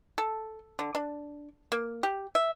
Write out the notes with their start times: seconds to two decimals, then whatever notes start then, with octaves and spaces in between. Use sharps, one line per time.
0.18 A4
0.79 D3
0.95 D4
1.72 A#3
2.03 G4
2.35 E5